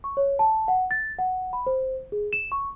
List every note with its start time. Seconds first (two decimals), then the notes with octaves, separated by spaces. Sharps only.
0.04 C#6
0.17 C#5
0.39 A5
0.68 F#5
0.91 A6
1.19 F#5
1.53 B5
1.67 C5
2.12 G#4
2.33 E7
2.52 C#6